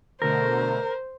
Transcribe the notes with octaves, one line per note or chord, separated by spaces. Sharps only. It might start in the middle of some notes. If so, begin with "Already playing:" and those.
B2 D3 A3 A#4 C5